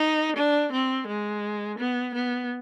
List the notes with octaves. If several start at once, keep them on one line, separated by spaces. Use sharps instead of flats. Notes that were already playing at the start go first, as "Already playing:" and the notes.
Already playing: D#4
D4
C4
G#3
B3
B3